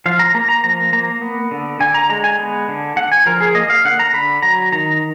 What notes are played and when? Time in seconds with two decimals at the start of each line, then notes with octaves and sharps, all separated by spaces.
0.06 F3 F5
0.19 A#5
0.34 A#3 A#5
0.49 A#5
0.64 F3 A#5
0.93 A#3 A#5
1.22 B3
1.51 D3
1.80 D3 G#5
1.94 A#5
2.10 G#3 A#5
2.24 G#5
2.39 B3
2.68 D3
2.96 D3 F#5
3.12 G#5
3.26 F3 A#4
3.41 G#4
3.55 A#3 D#5
3.70 F5
3.85 D3 F#5
3.99 A#5
4.14 D3 B5
4.42 F#3 A#5
4.72 D#3 A#5